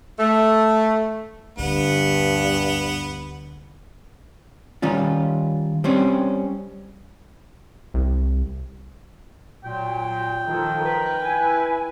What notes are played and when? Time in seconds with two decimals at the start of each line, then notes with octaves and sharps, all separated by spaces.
0.19 A3
1.58 D2 G2 B3
4.82 D#3 G3 C#4 F4
5.84 G3 C4 C#4
7.94 C2
9.64 A#2 F#3 G5
10.47 D#3 F3 A4
10.84 A#4 B4
11.20 E4 G#5